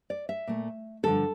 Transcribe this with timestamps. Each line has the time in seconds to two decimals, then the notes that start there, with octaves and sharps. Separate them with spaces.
0.10 D5
0.29 E5
0.47 A#2 A3
1.03 G2 D3 F3 A4